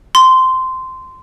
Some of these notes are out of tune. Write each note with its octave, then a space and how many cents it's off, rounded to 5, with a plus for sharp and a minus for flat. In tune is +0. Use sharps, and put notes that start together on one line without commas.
C6 -15